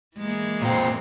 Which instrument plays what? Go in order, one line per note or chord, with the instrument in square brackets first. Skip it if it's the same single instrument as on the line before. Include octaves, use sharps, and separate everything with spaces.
[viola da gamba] E3 G#3 A#3
[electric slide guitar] A#2 C4